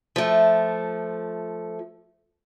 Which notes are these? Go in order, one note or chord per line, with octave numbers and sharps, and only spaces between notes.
F3 A3